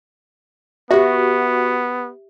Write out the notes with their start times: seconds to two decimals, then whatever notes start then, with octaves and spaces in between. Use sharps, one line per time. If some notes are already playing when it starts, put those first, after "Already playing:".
0.91 B3 F#4 G4 E5